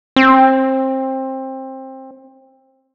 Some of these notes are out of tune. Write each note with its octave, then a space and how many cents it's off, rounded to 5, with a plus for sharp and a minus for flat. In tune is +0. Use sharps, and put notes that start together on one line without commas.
C4 +20